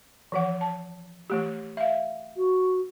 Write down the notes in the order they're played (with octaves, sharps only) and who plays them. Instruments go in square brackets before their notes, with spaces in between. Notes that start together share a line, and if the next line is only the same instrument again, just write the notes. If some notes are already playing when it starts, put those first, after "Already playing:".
[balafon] E3 F3 F#5
A5
E3 A3 G4
E5 F5
[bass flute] F#4